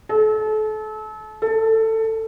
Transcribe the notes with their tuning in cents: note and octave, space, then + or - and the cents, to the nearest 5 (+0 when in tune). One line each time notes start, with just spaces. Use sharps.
A4 -35
A4 +15